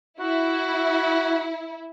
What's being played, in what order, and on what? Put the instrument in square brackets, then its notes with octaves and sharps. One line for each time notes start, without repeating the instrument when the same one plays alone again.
[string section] E4 [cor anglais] F#4